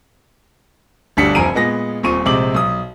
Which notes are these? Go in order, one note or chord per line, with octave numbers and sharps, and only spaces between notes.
G1 D2 G3 D4 B6 C#7
F1 F3 G#5 A#5 D7 D#7
A#2 G#3 B3 A#6
D#1 A#2 C4 C#6 D#7
A#1 C3 G#3 D6 F#7
B1 D#6